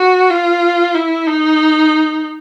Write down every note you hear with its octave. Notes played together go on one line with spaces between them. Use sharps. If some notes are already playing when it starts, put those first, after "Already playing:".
Already playing: F#4
F4
E4
D#4